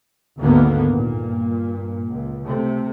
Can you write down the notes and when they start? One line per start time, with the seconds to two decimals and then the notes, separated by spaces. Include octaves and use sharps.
0.38 D2 G#2 D3 D#3 A#3 B3
0.95 G2 A#2
2.06 C#2
2.45 C3 A3